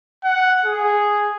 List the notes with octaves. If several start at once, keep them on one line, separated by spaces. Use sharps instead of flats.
F#5
G#4